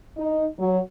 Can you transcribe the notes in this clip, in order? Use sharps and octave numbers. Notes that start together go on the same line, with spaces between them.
D#4
F#3